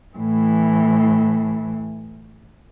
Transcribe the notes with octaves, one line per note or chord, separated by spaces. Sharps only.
A2 E3